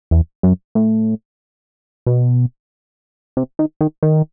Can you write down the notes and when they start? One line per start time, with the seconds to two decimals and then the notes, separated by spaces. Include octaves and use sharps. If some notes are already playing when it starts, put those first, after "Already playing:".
0.11 E2
0.43 F#2
0.75 A2
2.07 B2
3.37 C3
3.59 D#3
3.81 D#3
4.03 D#3